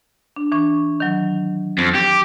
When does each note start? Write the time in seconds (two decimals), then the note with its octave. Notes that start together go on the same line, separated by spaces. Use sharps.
0.36 D4
0.52 E3 D4 C#6
1.00 D#3 F#3
1.78 F2
1.95 G4